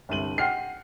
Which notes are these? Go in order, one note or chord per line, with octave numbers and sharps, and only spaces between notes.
G1 C2 D#7 F#7
F#5 G5 F6 C7